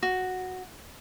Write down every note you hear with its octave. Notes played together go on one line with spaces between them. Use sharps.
F#4